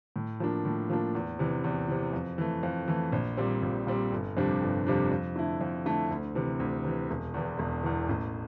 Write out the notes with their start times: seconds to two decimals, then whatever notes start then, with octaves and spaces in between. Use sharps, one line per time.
0.16 A2
0.40 F3 A#3 D4
0.65 A2
0.90 F3 A#3 D4
1.15 E2
1.39 C3 E3
1.64 E2
1.88 C3 E3
2.13 F2
2.38 E3 A3
2.63 F2
2.88 E3 A3
3.12 A#1
3.37 A#2 G3 C4
3.63 A#1
3.87 A#2 G3 C4
4.12 G1
4.37 F2 C3 G3 D4
4.62 G1
4.87 F2 C3 G3 D4
5.11 F2
5.36 D3 A3 E4
5.61 F2
5.85 D3 A3 E4
6.11 D2
6.35 C3 E3
6.60 D2
6.85 C3 E3
7.10 E1
7.34 E2 E3
7.59 E1
7.84 E2 E3
8.09 A1